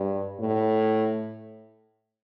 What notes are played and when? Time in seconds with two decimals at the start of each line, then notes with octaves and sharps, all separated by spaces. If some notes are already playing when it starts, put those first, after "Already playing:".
Already playing: G2
0.39 A2